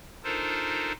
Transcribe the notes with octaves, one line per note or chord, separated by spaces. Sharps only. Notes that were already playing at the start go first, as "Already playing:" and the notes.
D4 D#4 F4 A4 A#4 C5